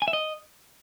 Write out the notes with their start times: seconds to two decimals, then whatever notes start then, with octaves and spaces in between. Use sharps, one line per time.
0.02 G#5
0.08 E5
0.13 D#5